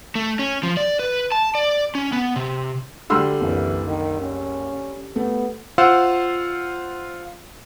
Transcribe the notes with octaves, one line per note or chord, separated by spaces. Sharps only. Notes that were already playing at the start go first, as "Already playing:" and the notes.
A3
C#4
F3
D5
B4
A5
D5
C#4
B3
C3
D2 D3 G3 C6 E6 F6
F#1 C2 E3
D#3
C#4
A3 B3
F4 C5 F5 F#5 E6